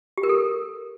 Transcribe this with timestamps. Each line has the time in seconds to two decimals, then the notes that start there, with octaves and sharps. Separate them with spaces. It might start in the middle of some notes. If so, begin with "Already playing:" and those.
0.18 G4
0.23 A#4
0.29 A4